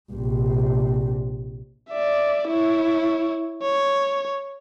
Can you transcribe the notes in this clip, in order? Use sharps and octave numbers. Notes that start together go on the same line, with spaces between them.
A#1 C3
D5 E5
E4 C#5
C#5